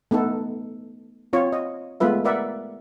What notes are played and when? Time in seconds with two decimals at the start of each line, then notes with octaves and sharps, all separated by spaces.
0.11 A3 B3 D#4 A4
1.33 C4 F4 C#5
1.53 D#5
2.00 G#3 A3 B3 F4 B4 E5
2.24 A#4 B4 D5 E5 F#5